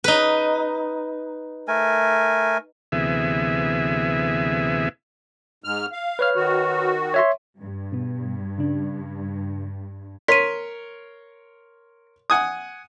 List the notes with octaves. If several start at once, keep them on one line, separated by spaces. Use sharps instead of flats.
D#4 B4
A3 A#4 G#5
D2 C3 E3 B3 G#4 E5
G#2 F6
F5
B4 C#5 F6
D#3 F#4
C#5 E5 C6
G2
B2 B3
C#3 D4
A#4 C#5 C6 B6 D#7
F#5 G#5 D#6